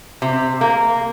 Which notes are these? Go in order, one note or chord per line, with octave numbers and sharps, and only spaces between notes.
C3
A#3